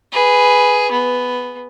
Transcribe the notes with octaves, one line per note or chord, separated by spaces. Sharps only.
G#4 B4
B3